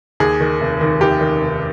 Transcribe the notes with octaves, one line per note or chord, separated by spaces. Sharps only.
D#2 G#4
D#3
F1
D#3
D#2 G4
D#3
F1